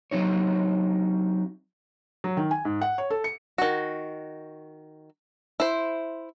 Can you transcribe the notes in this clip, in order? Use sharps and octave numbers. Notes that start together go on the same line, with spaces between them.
F#3 C4 D#4 C#5
F#3
D#3
G#5
G#2
F#5
C#5
A4
C#7
D#3 F#4
E4 C5